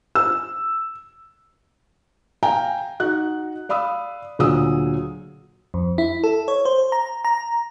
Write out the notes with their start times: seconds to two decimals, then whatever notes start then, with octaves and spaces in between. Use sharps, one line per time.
0.15 E6
2.43 F5 G5 G#5 A#5
3.00 D#4 F#4 F#6
3.69 D5 F5 B5 D#6 E6
4.39 D2 A#2 F#3 G#4 D#6 E6
5.74 F2
5.98 E4
6.24 A4
6.48 C#5
6.65 C5
6.92 A#5
7.25 A#5